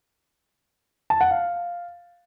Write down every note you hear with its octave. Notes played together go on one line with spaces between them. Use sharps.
A5
F#5
F5